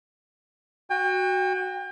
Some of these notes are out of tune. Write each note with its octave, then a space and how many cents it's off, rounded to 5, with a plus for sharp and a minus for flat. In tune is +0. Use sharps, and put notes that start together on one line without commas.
F#4 +0 G5 +35